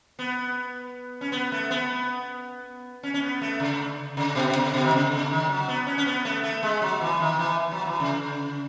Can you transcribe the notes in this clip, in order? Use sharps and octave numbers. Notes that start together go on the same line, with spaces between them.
B3
C#4
B3
A3
B3
C#4
C#4
B3
A3
C#3
C#3
B2
C#3
B2
D#3
C#3
C#3
D#3
F#3
B3
C#4
C#4
B3
A3
A3
G#3
F#3
E3
D#3
E3
F#3
E3
C#3